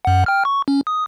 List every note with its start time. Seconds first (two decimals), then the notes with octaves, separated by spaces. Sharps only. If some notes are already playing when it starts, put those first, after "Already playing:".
0.05 F#2 F#5
0.26 G5 F6
0.45 C#6
0.68 C#4
0.87 D#6